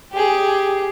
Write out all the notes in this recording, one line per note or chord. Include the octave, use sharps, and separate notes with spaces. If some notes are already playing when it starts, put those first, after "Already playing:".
G4 G#4